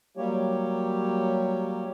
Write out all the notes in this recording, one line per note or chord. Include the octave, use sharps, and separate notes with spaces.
F#3 G3 A#3 G4 C#5